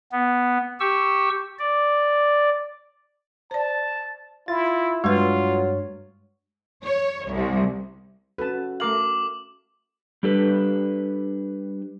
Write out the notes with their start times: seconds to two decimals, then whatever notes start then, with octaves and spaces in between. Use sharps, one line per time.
0.12 B3
0.80 G4 C#6 E6
1.59 D5
3.51 C5 D5 A5
4.48 E4 F4 A6
5.04 G2 F#3 G#3 F4 B4 C#5
6.85 C#5
7.31 C2
8.38 C#4 F#4 A4 B4 A5
8.80 A3 A#4 F5 D6 F#7
10.23 G3 D4 G4 A4 B4